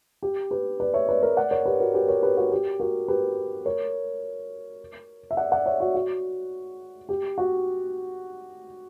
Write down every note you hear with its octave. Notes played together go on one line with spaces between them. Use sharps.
G4
G4 B4
B4 D5
C#5 E5
B4 D5
A#4 C#5
D5 F#5
A#4 C#5
G4 B4
F#4 A#4
G4 B4
A#4 C#5
G4 B4
F#4 A#4
G4
F#4 A#4
G4 B4
A#4 C#5
E5
D5 F#5
D5 F#5
C#5 E5
F#4
F#4
G4
F#4